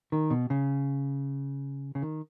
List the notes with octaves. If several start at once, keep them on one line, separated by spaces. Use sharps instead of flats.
D#3
B2
C#3
C#3
D#3